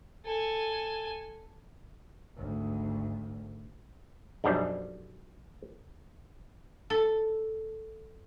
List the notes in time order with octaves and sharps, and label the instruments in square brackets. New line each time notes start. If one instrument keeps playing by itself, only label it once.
[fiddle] A4 G#5
[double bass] G#1 D2
[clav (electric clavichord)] B1 F#2 F3 G3 D4
[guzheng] A4